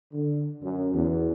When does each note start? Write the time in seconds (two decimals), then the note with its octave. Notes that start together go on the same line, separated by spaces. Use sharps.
0.13 D3
0.62 F#2
0.93 E2